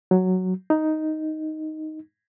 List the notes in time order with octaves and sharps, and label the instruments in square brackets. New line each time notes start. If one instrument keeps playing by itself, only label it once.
[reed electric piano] F#3
D#4